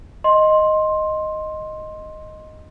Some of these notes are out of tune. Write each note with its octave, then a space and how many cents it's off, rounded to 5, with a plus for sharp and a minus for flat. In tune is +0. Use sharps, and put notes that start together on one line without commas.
D#5 +0 C6 +15